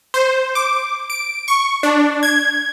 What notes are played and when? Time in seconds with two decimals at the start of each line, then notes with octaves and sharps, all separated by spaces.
0.14 C5
0.55 D6
1.10 D7
1.48 C#6
1.83 D4
2.23 G#6